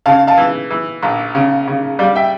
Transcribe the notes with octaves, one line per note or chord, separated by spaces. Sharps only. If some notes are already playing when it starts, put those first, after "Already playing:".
C#3 F5 A5
F5 A5
E3
E3
A#1
C#3
C#3
G3 D5 F5
E5 G5